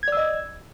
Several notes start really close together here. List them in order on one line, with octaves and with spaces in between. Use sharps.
G#6 D5 E6 D#5